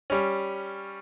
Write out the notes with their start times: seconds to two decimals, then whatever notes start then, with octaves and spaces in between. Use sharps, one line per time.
0.10 G3 C#4